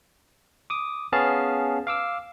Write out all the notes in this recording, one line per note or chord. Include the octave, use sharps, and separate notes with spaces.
D6 D#6
B3 C#4 G#4 F5 A5
F5 D6 E6